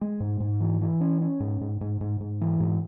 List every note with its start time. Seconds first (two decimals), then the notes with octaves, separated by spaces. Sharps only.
0.01 G#3
0.20 G#2
0.40 G#2
0.60 E3
0.81 E3
1.01 C#4
1.21 C#4
1.40 G#2
1.61 G#2
1.81 G#2
2.01 G#2
2.20 G#2
2.41 E3
2.60 G#2